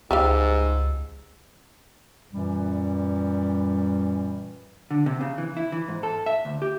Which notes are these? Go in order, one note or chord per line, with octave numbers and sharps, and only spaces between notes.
C#2 G#2 G3 G4 F5 E6
F#2 A#2 E3 G3
D3
C3
C#3
E3
E4
E3
G#2
A4
E5
D2
G4